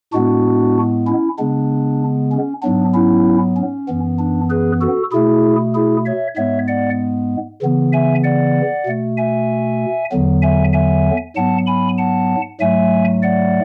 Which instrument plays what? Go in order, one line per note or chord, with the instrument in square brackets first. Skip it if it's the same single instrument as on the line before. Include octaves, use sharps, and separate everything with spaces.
[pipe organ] A2 G#3 B3 D4 F#4
C#4 E4
C#3 G#3 B3 D4
C#4
G#2 F#3 B3 D4
C#4 E4
C#4
F#2 E3 B3
D4
G#4 B4
F#4 A4
B2 A3 E4 G#4
E4 G#4
C#5 E5
G#2 G#3 B3 C#5 E5
D5 F#5
C#3 E3 B3
E5 G#5
D5 F#5
B2 A3
E5 G#5
E2 D3 F#3 B3
E5 G#5
E5 G#5
G#2 F#3 B3 F#5 A5
G#5 B5
F#5 A5
G#2 F#3 A3 E5 G#5
D5 F#5